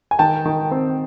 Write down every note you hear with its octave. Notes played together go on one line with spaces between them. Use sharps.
G#5
D#3 G5 A5
D#3
C4